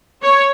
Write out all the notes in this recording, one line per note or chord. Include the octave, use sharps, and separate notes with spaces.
C#5